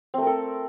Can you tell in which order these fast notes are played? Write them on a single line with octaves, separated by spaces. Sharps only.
C4 A3 A#4 A4